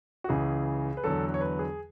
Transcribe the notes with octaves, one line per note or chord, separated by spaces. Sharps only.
F#4
C#2 C#3 E3 G#4
B4
E2 D3 F#3 A4
C#5
B4
G#4